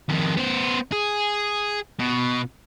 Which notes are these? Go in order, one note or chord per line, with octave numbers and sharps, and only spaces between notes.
F2 D#3
B3 C5
G#4
B2